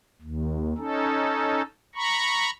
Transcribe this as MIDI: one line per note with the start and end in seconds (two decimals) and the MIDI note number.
0.22 0.73 39
0.78 1.62 61
0.78 1.62 63
0.78 1.62 69
1.95 2.50 82
1.95 2.50 83
1.95 2.50 85